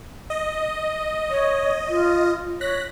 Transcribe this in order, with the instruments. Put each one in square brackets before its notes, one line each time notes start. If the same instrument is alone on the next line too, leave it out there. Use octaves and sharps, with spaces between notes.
[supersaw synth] D#5
[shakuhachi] C#5
F4
[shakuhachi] C#5 [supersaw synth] F#6 A#6 B6